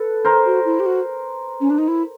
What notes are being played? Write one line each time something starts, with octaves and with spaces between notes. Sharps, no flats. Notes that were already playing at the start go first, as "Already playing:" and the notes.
Already playing: A4 B4
A#4 C5
F#4
E4
G4
F#4
C#4
D4
D#4
E4